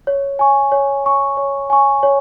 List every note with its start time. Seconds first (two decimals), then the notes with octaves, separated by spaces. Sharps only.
0.07 C#5
0.39 G#5 C#6
0.72 C#5
1.04 G#5 C#6
1.37 C#5
1.70 G#5 C#6
2.03 C#5